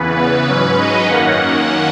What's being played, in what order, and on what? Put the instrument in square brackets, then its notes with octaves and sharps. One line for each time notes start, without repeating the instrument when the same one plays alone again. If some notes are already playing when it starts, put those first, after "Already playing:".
Already playing: [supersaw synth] E2 C#3 E3 B3 B4
B4
G#2 F#3 C#4
D#5
F#2 D#3 A#3 C#4 F#5
F#5